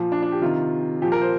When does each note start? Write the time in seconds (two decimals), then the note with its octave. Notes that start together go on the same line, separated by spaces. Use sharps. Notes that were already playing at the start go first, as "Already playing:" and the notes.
Already playing: A#2 F3
0.12 D4
0.22 D4
0.32 G4
0.41 C3 D#3 F4
1.02 A#2 F3 G4
1.12 A#4
1.21 C5